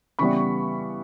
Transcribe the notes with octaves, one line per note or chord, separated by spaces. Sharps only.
C#3 E3 G3 B3 B5 C#6